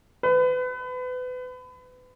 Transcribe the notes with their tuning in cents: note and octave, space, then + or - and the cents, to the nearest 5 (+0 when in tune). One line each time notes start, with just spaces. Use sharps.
B4 +30